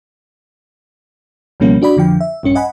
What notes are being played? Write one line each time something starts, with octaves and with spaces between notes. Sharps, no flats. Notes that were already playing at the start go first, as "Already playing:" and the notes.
C#2 B2 F3 G3 A#3 C#4
D4 F#4 D5 B5
F2 D3 F3 G5
E5
A#1 G2 C#4 C#7
D#5 F#5 G#5 B5